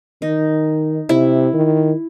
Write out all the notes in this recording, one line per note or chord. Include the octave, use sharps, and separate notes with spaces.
D#3 D#4
C3 E4
D#3